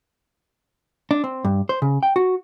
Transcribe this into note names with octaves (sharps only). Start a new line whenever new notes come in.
D4
C4
G2
C5
C#3
G5
F#4